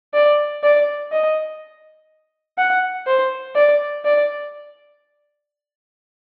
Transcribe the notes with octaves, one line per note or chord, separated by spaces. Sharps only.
D5
D5
D#5
F#5
C5
D5
D5